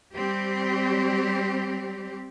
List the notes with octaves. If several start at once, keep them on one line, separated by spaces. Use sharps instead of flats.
G3 C4 G4